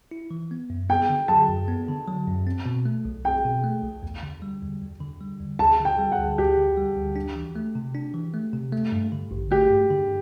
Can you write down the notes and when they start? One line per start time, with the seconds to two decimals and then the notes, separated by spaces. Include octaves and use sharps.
0.11 E4
0.31 E3
0.51 B3
0.70 F#2
0.89 B3 G5
1.09 D3
1.28 F#3 A5
1.48 F#2
1.68 B3
1.88 D3
2.08 F#3
2.27 F#2
2.47 C4
2.66 B2
2.85 A3
3.05 B1
3.25 C4 G5
3.45 B2
3.64 A3
3.83 B1
4.03 E2
4.23 D3
4.42 G3
4.62 E2
4.82 E2
5.01 D3
5.21 G3
5.40 E2
5.59 D2 A5
5.80 D3
5.85 G5
5.99 G3
6.12 F#5
6.18 D2
6.38 D2 G4
6.57 D3
6.77 G3
6.97 D2
7.16 D4
7.36 E3
7.56 A3
7.75 C3
7.95 D4
8.14 E3
8.34 A3
8.53 C3
8.72 A3
8.92 G2
9.12 D3
9.31 A1
9.51 A3 G4
9.70 G2
9.90 D3